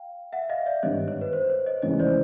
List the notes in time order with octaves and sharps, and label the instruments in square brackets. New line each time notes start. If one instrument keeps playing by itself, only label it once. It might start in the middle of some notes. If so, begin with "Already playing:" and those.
Already playing: [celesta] F5 G5
E5 F#5
D#5 F5
D5 E5
[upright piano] G#1 G2 D#3 G3 B3 [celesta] C#5 D#5
[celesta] C#5
B4
C5
C#5
C#5 D#5
[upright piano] F1 D#2 C#3 E3 G#3 [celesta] C#5 D#5
[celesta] C5 D5